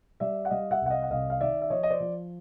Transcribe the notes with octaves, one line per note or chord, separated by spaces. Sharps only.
G3 D5 E5
F#5
G3 D#5 F5
E5 F#5
C2 F#5
D#5 F5
F#5
C2 D#5 F5
F5
D#3 D5 E5
E5
F3 C#5 D#5
D#5
C5 D5
F3